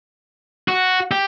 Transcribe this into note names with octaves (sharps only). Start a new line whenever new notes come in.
F#4
G4